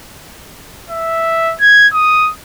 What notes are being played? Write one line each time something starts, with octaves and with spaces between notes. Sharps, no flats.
E5
G#6
D#6